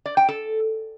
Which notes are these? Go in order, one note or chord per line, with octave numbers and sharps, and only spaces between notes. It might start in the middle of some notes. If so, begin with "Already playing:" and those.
D5
G5
A4